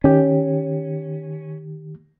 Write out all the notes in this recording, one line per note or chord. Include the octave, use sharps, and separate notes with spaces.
D#3 C#4 G4